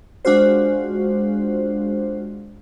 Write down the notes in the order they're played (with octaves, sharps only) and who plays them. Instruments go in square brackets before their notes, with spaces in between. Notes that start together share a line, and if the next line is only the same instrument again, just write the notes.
[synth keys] G#3 D4 F4 F#4 C5